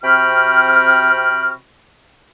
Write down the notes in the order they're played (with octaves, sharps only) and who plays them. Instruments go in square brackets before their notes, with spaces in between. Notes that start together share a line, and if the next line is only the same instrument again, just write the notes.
[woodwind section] C3 C4 F#4 G5 B5 F6